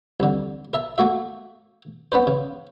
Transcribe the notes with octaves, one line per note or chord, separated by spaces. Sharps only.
C2 D3
A#4 E5 A5
A3 A#3 F#4 E5
B3 C#4 B4 C5
C#3